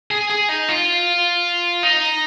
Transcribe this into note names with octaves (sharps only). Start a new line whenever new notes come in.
G#4
G#4
D#4
F4
D#4